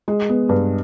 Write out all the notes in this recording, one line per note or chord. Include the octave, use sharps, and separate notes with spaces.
G#3
B3
G2